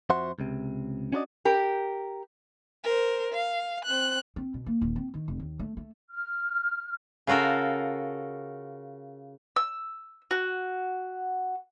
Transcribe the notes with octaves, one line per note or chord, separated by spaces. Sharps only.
F2 F#4 C5 E5 F#5 C6
C#2 C3
C#4 D4 F#4 A#4 D5 D#5
G4 A#4
A#4 C5
F5
C4 F#6
C4
B2
A#3
D#1
C4
D#3
F1
D#2
A3
A3
F6
C#3 F4 F#4 A4 A#4
E6
F#4